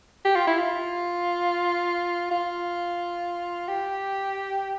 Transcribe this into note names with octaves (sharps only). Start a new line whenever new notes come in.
G4
F4
E4
F4
F4
G4